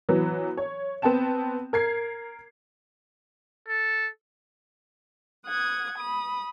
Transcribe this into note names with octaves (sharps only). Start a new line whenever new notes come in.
E3 F#3 B3
C#5
B3 C4 G5 A5 E7
A#4 G#6 C7
A4
F#5 D#6 G#6
B5 D#6